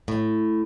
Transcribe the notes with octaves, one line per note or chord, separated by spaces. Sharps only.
A2